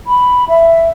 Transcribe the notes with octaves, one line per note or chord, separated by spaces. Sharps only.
B5
E5